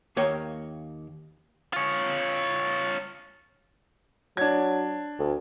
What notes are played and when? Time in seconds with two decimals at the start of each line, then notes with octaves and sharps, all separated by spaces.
0.17 D#2 A#3 C#5 G5
1.73 F4 C#5
4.37 F#3 D4 G#6
5.19 D2